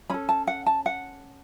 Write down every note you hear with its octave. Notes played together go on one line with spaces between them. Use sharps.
C#4 A4 B5
A5
F#5
A5
F#5